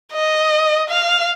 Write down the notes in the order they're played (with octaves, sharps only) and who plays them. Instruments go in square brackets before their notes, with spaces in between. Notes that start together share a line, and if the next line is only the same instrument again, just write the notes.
[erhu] D#5
F5